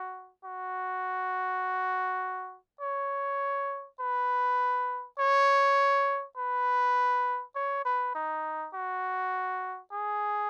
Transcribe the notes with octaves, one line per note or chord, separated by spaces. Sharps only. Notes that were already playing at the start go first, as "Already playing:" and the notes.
Already playing: F#4
F#4
C#5
B4
C#5
B4
C#5
B4
D#4
F#4
G#4